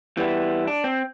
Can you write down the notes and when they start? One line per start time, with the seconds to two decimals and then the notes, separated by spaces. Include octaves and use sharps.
0.17 E3 G3 B3 E4
0.67 D4
0.84 C4